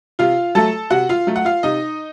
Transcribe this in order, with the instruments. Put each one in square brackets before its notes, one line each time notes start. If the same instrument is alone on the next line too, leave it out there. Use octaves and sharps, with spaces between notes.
[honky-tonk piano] C3 F4 F5
F#3 A3 A4 A5
C3 F#4 F#5
F4 F5
F#3 A3
F#5
F4 F5
C3 D#4 D#5